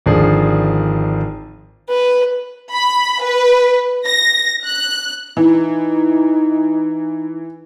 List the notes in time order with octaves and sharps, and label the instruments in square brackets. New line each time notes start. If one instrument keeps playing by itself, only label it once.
[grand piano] G#1 D3 F3 G#4 D5
[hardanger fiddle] B4
[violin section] B5
B4
A#6
F#6
[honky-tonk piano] E3 [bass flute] D#4